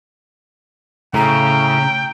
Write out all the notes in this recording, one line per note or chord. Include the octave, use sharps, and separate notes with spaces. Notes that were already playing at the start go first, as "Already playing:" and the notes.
A2 C#3 G5 A#5